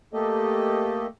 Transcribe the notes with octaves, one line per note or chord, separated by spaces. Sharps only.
A3 A#3 G4 A4 D#5